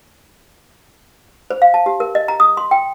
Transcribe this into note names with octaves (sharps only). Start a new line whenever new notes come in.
C5
F5
A5
G4
A#4
D#5
A#5
D#6
C6
G5